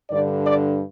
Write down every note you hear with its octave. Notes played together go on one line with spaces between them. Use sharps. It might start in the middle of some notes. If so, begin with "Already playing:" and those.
G2 D3 D5
D5